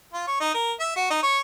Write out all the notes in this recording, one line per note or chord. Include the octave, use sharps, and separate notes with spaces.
F4
C#5
D#4
A#4
E5
F#4
D#4
C#5